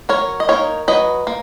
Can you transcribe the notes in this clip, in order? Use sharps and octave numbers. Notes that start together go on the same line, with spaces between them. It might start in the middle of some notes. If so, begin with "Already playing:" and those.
F#3 A#4 C#5
D#5
A#3 D#4 A#4 C#5
F#3 B4 D#5
A#3